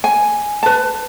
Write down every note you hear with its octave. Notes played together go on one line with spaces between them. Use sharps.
G#5
B4 A5